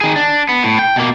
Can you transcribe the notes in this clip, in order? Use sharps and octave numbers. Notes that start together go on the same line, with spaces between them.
D#3 G#4
D4
B3
A2
G5
B2 A#3